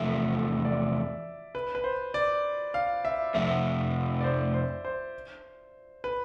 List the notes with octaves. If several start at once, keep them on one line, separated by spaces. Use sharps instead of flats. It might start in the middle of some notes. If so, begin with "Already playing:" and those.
Already playing: E2 C3 F3 A3 E5
D5
B4
B4
C5
D5
F5
E5
F2 C3 F3 A3 E5
D5
C5
C5
C5
B4